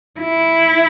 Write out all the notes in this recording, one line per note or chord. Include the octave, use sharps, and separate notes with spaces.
E4